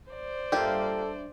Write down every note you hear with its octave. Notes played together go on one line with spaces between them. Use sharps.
C5 D5
G2 A#3 F4 G4 A4 E5